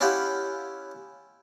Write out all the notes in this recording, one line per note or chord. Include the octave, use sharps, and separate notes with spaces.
C#4 E4 F4 G4 D#5 F#5